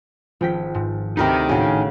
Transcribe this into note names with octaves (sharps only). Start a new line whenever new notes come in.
G#1 F3 G5 B6
G#2
D2 C3 D#4 A#4 B4 G5
G#1 A2 C#3 F#4 G#5